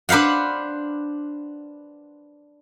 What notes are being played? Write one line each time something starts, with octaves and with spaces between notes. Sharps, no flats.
D4 B4 C5 F5 F#5